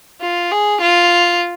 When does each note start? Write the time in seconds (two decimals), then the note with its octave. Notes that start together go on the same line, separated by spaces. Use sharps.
0.21 F4
0.52 G#4
0.82 F4